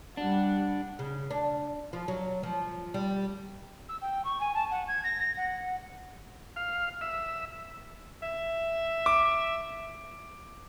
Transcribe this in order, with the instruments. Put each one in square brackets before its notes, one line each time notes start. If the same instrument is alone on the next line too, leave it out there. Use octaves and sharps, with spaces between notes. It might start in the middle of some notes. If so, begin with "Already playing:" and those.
[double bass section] G3 [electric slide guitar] D4 [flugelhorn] F#5
[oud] C#3
D4
F3
F#3
F3
G3
[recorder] E6
G5
C#6
G#5
A5
F#5
G#6
A#6
A#6
F#5
[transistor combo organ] F5
E5
[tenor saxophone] E5
[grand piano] D6